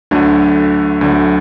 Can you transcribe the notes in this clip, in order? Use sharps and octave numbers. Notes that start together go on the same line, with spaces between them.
D2 D3 F#3 A3
D2 D3 F#3 A3